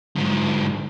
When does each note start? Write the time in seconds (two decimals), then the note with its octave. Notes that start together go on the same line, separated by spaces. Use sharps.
0.17 G#2 D3